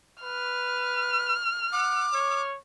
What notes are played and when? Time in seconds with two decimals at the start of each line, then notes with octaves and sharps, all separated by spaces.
0.23 B4 F6
1.72 F#5 D6
2.13 C#5